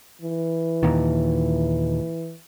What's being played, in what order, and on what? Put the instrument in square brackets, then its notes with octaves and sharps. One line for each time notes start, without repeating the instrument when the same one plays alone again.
[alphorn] E3
[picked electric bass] D#2 A#2 D#3